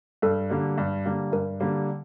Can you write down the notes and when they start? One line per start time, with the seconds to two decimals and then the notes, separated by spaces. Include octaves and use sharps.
0.22 G2 A4
0.50 D3 G3 A#3
0.78 G2
1.05 D3 G3 A#3
1.32 G2 A#4
1.60 D3 G3 A#3